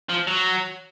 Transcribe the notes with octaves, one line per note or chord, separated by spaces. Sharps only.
F3
F#3